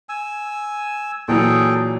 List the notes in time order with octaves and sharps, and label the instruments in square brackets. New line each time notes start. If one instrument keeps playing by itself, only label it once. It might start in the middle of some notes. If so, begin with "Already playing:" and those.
[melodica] G#5 E6
[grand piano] A#2 E3 F#3 [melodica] G#4 A4 G5